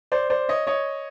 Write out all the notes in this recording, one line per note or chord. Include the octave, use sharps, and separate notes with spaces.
C5 D5
C5 D5
C#5 D#5
C#5 D#5